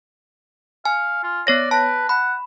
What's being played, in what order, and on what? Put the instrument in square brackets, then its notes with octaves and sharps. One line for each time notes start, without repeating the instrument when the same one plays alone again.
[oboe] F5 [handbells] G#5
[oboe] F4
[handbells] B3 C#5 A#6 [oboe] D5
[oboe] B4 [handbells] A5 A#6
[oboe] F#5 [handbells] B5